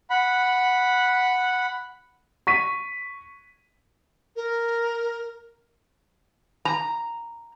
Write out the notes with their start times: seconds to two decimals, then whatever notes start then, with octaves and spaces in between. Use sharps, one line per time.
0.10 F#5 B5
2.47 C#6 B6 D#7
4.36 A#4
6.65 A#5